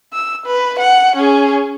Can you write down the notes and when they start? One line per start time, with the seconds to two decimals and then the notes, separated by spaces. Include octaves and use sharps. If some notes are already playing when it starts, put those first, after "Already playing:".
0.13 E6
0.46 B4
0.79 F#5
1.16 C#4 G#4